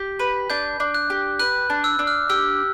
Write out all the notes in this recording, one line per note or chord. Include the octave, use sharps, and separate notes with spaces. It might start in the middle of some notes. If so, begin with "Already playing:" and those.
Already playing: G4
B4
D4 G6
D4
F#6
G4
B4 F#6
D4
E6
D4
F6
G4 E6